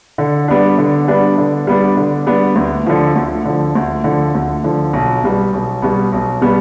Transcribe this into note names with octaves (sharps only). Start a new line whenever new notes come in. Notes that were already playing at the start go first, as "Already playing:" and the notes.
D3
G3 B3 D4
D3
G3 B3 D4
D3
G3 B3 D4
D3
G3 B3 D4
D2
D3 F3
D2
D3 F3
D2
D3 F3
D2
D3 F3
B1
B2 G3 B3
B1
B2 G3 B3
B1
B2 G3 B3